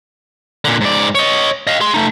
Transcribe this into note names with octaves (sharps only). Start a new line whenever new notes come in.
A#2 D3
G#2 D5
C#5 D#5
D#5 F5
G#4 C6
A3 D#4